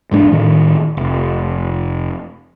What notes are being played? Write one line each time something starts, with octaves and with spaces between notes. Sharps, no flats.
E1 G#2 A3 D4
A2 D#3
F1